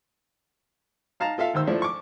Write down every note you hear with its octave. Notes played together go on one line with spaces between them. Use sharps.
D#4 F5 A5 A#5
F4 A4 E5 F5
D#2 D#3 C5 E6
F3 A3 D4 E4
C#6 D6